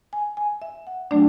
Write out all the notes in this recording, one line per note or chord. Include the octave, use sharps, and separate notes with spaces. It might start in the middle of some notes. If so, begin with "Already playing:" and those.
G#5
G#5
E5
F#5
F#3 A3 D4 D5